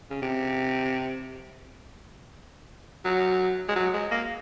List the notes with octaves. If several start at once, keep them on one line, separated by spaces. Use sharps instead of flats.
C#3
C3
F#3
G#3
F#3
G#3
A#3